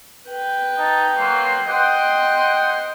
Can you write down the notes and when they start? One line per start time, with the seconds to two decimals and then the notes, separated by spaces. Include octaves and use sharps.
0.28 B4 G5
0.77 D#4 D#5 A5
1.17 F#3 A#3 C6
1.68 C5 D#5 F#5 G5 C6